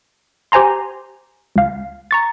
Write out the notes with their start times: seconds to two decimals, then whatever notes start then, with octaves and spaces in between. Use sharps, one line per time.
0.52 G4 C5 G#5 A#5 C6
1.56 C#2 F5
2.11 A#5 C#6 A6